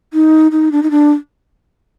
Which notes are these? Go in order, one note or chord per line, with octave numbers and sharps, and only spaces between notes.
D#4
D#4
D4
D#4
D4